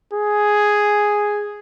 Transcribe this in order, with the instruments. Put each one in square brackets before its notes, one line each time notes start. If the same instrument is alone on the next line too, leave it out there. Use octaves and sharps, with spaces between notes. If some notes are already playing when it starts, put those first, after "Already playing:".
[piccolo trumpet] G#4